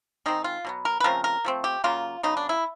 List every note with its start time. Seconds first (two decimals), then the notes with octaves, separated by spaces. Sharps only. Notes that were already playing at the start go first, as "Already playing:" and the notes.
0.26 D#3 G#3 C4 D#4
0.44 F4
0.65 B2 F#3 B3
0.85 A#4
1.00 B4
1.04 C#3 F3 A3 C4 A#4
1.24 A#4
1.45 F3 A3 C4
1.64 G4
1.84 C#3 F#3 A#3 F4
2.23 C#3 F#3 B3 D#4
2.37 D4
2.49 E4